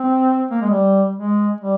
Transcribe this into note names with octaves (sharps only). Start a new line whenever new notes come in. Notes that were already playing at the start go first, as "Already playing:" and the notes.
Already playing: C4
A#3
G#3
G3
G#3
G3